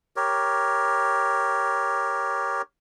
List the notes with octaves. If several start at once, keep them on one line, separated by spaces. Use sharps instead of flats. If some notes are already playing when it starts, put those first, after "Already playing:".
G4 A#4 C#5